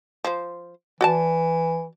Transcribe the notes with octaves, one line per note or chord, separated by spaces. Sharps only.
F3 C5
E3 F#4 D5 A5